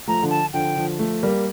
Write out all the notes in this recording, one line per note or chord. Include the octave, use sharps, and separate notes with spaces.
F3 A3 A#5
D3 F3
A5
D3 F3 G5
D3 F3
F3 A3
G3 A#3